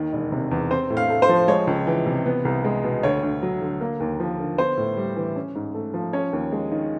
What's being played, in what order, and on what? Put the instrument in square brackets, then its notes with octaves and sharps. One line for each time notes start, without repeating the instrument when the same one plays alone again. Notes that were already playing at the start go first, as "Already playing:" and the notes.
Already playing: [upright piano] D#2 D#3
E1
C3
E2
C4 C5
A2
F5
A3
C5
F3
G#3 C#5
C#2
E3
C3
B3
C2
G#3
B2
D2 C#5
D2
F#3
D3
A#3
D#2
F3
D3
B3 C5
A2
G3
E3
C#4
G#2
A3
F3
C#4 C#5
D#2
G#3
D#3